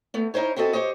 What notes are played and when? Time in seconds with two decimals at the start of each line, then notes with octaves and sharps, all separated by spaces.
0.14 A3 B3
0.34 C#4 D#4 E4 C5 C#5
0.56 B3 C4 F#4 A4 D#5
0.73 G4 C5 C#5 D#5